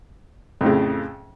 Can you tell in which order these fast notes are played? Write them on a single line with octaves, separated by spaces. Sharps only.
F2 A2 C#3